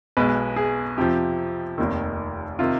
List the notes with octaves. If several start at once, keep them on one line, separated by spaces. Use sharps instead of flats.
B1 B2 G#3 B4
G#4
F2 C3 F3 G4
F1 D#2 D#3
C3 D#3 F4